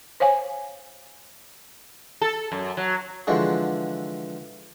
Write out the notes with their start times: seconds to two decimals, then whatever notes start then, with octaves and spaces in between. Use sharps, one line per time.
0.20 C5 C#5 F5 G#5
2.21 A4
2.52 F#2
2.77 F#3
3.27 D3 E3 F3 G#3 D4 F#4